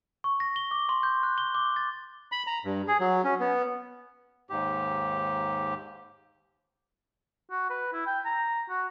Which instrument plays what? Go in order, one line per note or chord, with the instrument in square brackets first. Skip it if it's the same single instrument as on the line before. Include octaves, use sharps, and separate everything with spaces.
[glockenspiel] C#6
A#6
G7
D6
C6
G6
F#6
G7
D6
A6
[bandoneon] B5
A#5
G2
G#4
F#3
C#4
B3
D#2 G#2 G4
[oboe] F#4
B4
E4
G5
A#5
F#4